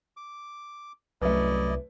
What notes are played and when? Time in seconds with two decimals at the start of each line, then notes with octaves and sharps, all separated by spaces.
0.17 D6
1.22 C2 F#2 A3 E4 B4 D5 D#5